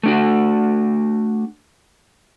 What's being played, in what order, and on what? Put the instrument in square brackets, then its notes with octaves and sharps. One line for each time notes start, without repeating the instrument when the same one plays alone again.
[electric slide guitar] A3 D4 F#4